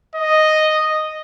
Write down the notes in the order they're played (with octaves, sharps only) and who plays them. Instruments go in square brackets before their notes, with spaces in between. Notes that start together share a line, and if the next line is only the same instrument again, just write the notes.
[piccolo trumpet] D#5